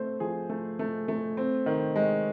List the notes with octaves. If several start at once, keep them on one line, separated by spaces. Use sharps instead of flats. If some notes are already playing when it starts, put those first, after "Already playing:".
Already playing: A3 C4 C5
F3 G#4
A3
A3
A3
C4
D#3
G#3